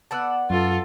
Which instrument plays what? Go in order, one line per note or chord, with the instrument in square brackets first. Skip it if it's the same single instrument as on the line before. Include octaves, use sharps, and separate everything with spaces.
[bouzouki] B3 D5 F#5 [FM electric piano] A5 E6 F#6
[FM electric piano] F#2 [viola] F4 A4